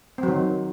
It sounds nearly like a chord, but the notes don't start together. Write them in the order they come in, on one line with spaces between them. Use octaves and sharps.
C4 F#3 D#3